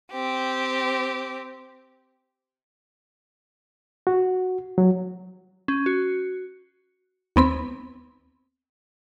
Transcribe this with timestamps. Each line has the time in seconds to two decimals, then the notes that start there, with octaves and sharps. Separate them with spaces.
0.12 C4 G4
4.07 F#4
4.78 F#3
5.68 C#4
5.86 F#4
7.36 D#2 B3 C4 B5